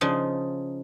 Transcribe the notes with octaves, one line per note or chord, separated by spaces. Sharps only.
C#3 F3 D#4